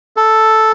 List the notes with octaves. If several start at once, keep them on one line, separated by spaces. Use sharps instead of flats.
A4